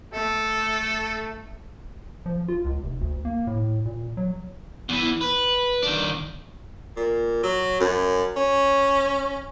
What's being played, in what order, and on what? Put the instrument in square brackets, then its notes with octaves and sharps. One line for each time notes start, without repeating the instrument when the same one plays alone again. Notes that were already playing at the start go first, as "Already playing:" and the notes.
[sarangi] A3 [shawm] A4
[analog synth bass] F3
F4
C#2
F1
D2
A#3
A2
A#2
F#3
[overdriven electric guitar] E2 E3
B4
D#3 D4
[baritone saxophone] A#2
F#3
F#2
C#4